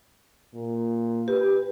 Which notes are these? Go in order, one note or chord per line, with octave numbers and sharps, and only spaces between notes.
A#2
G4 B4